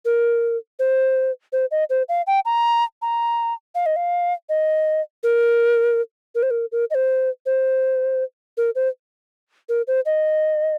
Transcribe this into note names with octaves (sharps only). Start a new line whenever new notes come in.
A#4
C5
C5
D#5
C5
F5
G5
A#5
A#5
F5
D#5
F5
D#5
A#4
A#4
C5
A#4
A#4
D#5
C5
C5
A#4
C5
A#4
C5
D#5